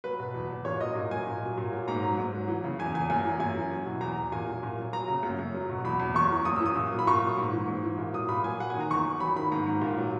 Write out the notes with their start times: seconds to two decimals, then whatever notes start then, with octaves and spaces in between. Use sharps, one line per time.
0.04 F#3 B4
0.20 B2
0.35 E2
0.50 E2
0.65 A#2 C#5
0.81 F#3 D#5
0.95 A#2
1.11 F#3 G#5
1.27 A#2
1.42 F#3
1.58 A#2
1.73 F#3
1.88 G#2 A#5
2.02 F#3
2.18 G#2
2.34 F#3
2.48 E3
2.64 C#3
2.79 E2 G#5
2.94 E2 G#5
3.10 F#2 G#5
3.25 E3
3.40 F#2 G#5
3.56 E3
3.71 F#3
3.86 B2
4.01 E2 A#5
4.17 E2
4.32 A#2 G#5
4.47 F#3
4.63 A#2
4.78 F#3
4.93 F#3 A#5
5.08 C#3
5.23 F#2
5.39 F#2
5.54 F#3
5.70 B2
5.85 E2 B5
6.00 E2
6.15 F#2 C#6
6.31 E3
6.45 F#2 D#6
6.56 E6
6.61 E3
6.66 D#6
6.76 A#2
6.91 F#3
6.99 B5
7.07 A#2 C#6
7.22 F#3
7.38 G#2
7.52 E3
7.67 G#2
7.84 E3
7.98 A#2
8.13 F#3 D#6
8.29 A#2 B5
8.44 F#3 G#5
8.60 F#3 F#5
8.70 G#5
8.75 D#3
8.80 A#5
8.91 E2 C#6
9.05 E2
9.20 F#3 B5
9.36 D#3 B5
9.52 G#2 A#5
9.66 G#2
9.81 A#2
9.98 F#3